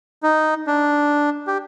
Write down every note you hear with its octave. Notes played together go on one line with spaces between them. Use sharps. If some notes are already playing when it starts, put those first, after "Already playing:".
D#4
D4
G4